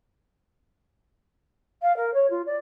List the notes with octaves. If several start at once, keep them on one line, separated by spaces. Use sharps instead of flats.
F5
A#4
C#5
F4
D5